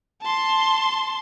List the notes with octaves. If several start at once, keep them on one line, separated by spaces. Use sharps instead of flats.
A5 C6